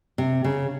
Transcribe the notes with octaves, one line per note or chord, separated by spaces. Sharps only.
C3
C#3